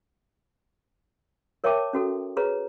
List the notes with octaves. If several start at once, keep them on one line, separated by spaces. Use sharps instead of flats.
A#4 C#5 E5 G5 A5 D6
C#4 F#4 A4
G#4 B4 C#5 A#5